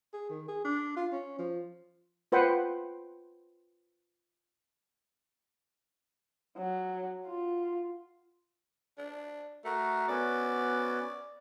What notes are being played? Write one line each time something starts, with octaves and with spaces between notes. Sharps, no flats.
G#4
D#3
G#4
D4
F4
C#4
F3
F4 B4 C5 F#5 G5
F#3
F4
D4
A3 F#4 A#4
B3 C#4 F#4 D5